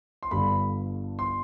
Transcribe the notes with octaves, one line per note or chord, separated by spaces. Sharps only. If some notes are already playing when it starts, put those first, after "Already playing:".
C6
G1 G2 D3 B5
C6